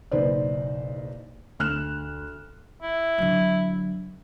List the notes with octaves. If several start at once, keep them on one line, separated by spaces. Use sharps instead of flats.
F#1 B1 D#4 B4 C5 D5
D2 F6 F#6 E7
E4
D3 F#3